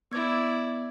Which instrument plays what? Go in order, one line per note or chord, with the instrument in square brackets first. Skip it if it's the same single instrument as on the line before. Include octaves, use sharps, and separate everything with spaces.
[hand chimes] B3 G#6 [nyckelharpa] E4 D5